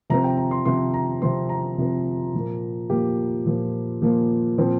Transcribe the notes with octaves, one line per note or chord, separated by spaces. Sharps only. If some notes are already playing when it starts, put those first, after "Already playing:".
C3 F3 C4 A#5
G5
A#5
C6
C3 F3 C4 C6
A#5
C3 F3 C4 C6
A#5
C3 F3 C4
A#2 F3 A#3
A#2 F3 A#3 G4
A#2 F3 A#3
A#2 F3 A#3
A#2 F3 C4